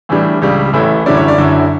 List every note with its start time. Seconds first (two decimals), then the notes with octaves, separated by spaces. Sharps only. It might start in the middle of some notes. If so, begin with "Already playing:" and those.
0.09 A2 E3 G3 D4
0.42 C#2 C#3 G3
0.73 A1 A2 E3 A3 E4
1.06 F#2 D3 G3 C#4 E4 D5
1.17 C#5
1.28 D5
1.38 F#2 D3 F#3 C#4 E4